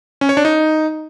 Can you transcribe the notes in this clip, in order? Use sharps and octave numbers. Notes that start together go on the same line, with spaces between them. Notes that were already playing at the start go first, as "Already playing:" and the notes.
C#4
C#5
D4
D#4